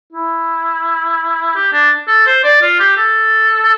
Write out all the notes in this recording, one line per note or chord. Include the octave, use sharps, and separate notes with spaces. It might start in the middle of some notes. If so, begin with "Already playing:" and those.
E4
G4
D4
A4
C5
D5
F4
G4
A4